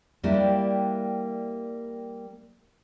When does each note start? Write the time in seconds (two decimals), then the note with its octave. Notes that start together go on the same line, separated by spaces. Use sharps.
0.23 G3 A#3 D4 E4 G4